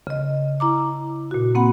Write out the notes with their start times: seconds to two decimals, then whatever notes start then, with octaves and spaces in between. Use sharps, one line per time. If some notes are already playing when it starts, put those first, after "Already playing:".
0.07 C#3 D#5
0.60 E4 A#5 D6
1.31 A#2 F#4
1.55 A#3 C4 F#5 B5